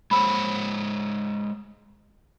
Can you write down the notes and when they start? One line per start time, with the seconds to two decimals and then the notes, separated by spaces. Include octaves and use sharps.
0.11 G#3 C5 C#5 B5 E6